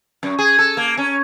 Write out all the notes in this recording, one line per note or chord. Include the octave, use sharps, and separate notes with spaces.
F#2
G#4
A4
A#3
C#4